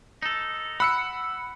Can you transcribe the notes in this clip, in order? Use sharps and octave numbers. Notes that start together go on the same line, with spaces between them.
D#4 A4
F#5 B5 E6 C#7